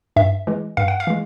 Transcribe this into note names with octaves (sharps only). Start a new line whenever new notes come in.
G2 E5
E3 G#3
G2 F5
F#5
F5
E3 G#3